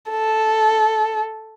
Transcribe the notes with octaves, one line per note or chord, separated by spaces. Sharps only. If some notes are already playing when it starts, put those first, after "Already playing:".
A4